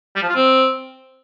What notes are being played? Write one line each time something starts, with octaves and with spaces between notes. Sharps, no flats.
G3
F3
F4
C4